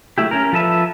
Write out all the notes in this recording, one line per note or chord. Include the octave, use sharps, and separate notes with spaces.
F#3 A3 E4 G4
C#4 A#4
F3 A4 B4 E5 A5